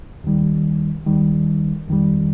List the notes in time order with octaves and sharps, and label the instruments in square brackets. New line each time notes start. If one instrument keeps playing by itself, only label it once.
[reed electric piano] D#2 D#3 G3
D#2 D#3 G3
F2 D#3 G3